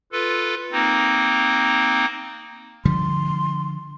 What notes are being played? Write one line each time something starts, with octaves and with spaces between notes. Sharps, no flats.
F4 A4 B4
A#3 C4 D#4
D3 F3 G3 C6